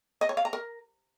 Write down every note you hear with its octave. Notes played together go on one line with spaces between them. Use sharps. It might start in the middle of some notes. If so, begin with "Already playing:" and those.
D#5
C#5
F5
A#5
A#4